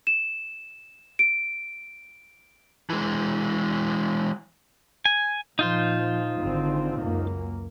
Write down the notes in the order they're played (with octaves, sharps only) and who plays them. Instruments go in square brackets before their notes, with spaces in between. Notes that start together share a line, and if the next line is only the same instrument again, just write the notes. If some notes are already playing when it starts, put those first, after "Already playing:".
[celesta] E7
D7
[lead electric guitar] E3 G#3
[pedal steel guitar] G#5
[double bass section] A#2 F3 [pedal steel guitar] D#4 F4 C5
[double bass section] G#1 D3 C4
C#2 F#2 A#3